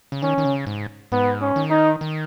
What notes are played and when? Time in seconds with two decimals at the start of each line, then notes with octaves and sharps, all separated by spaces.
0.12 C#3
0.22 D#3 C#4
0.38 D#3
0.45 C#3
0.67 G#2
1.12 G#2 B3
1.42 C#4
1.56 D#3
1.70 D#4
2.01 D#3